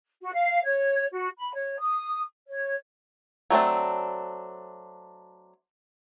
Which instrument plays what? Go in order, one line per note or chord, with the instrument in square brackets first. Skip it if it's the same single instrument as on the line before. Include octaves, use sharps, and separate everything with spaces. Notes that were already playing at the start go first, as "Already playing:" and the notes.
[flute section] F#4
F5
C#5
F#4
B5
C#5
D#6
C#5
[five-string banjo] F#3 A3 C4 D4